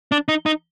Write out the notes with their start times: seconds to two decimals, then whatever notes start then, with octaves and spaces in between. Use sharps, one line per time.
0.12 D4
0.28 D#4
0.46 D#4